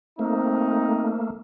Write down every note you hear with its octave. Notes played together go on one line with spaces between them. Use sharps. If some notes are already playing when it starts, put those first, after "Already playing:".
A3 A#3 C4 D#4